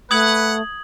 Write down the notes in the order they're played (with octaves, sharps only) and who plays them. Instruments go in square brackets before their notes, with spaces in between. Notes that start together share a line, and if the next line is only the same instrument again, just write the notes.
[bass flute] A3 [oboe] B4 [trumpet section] F#5 [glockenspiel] D#6 G#6 F#7